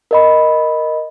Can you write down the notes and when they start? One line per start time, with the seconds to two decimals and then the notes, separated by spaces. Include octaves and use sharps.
0.11 A#4 D#5 B5